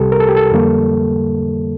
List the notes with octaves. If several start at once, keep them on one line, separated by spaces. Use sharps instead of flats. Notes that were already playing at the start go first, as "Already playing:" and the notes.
Already playing: C2 C3 G3 G4 A4
A#4
A4
G4
A4
F2 D3 G3 A#3